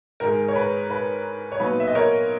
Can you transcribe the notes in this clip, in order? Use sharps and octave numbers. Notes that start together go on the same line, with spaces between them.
G#2 D#3 G#3 A#4
C#5
B4
B4
C#5
A#2 F#3 B3 D#4 B4
E5
D#5
A#4 C#5